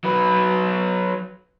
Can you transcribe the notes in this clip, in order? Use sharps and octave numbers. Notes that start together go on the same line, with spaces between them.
F#3 B4